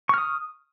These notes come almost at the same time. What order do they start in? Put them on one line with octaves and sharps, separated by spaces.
C#6 F6 D#6